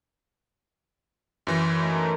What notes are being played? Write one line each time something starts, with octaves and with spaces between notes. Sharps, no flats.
F#2 E3 A#6
A3 D#4 A#4